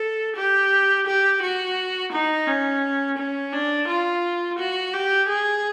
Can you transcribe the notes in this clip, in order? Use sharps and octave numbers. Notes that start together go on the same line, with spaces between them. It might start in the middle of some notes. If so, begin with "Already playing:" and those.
Already playing: A4
G4
G4
F#4
D#4
C#4
C#4
D4
F4
F#4
G4
G#4